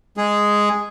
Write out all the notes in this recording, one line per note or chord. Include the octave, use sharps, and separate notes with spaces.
G#3 G#4